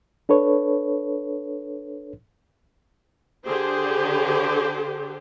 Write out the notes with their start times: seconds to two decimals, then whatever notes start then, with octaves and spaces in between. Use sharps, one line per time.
0.29 D4 A4 B4 C#5
3.45 D3 G4 G#4 C5